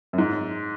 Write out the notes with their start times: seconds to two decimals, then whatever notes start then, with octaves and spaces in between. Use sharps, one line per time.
0.13 F#2
0.18 G#2